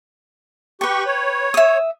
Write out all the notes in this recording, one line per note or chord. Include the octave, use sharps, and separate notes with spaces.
G4 B4 G5 C#6
C#5
E5 D#6